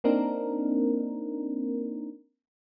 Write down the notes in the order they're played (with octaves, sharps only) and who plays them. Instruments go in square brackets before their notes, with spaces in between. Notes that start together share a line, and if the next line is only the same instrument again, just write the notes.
[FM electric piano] A#3 C4 D4 D#4 A#4